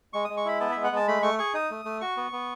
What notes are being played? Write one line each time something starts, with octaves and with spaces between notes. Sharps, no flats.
G#3 C#6
G#3 D#6
C#6
E4 B5
B3 A5
G#3 E5
F#5
G#3 A5
A3 B5
A3 C#6
G#4 C#6
D#4 D#6
A3
A3
F#4 C#6
B3
B3